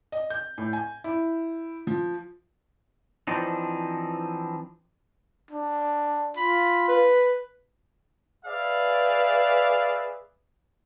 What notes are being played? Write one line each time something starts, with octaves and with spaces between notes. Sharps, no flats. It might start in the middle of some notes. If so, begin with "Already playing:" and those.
D#5
G6
A2
G#5
E4
F3
E3 F3 C4 D4 D#4
D4
F4 B5
B4
G#4 B4 D5 E5 F5